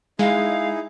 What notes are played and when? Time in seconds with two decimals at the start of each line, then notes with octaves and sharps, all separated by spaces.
0.19 G#3 D#4 E4 G#4 F5